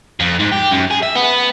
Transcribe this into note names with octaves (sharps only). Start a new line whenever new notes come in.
F2
G#2
G4
F#2
G#4
E5
B3